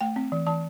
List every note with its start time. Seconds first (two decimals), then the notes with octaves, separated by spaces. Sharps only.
0.01 A3 G5
0.16 C4
0.32 E3
0.46 E3 A5